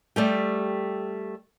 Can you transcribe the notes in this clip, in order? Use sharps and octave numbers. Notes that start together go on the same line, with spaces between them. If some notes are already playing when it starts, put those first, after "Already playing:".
G3 A3 G4